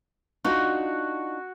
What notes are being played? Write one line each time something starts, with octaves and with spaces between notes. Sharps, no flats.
D4 D#4 F4 F#4